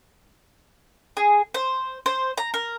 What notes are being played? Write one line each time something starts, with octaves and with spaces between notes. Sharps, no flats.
G#4
C5
C5
A#5
A#4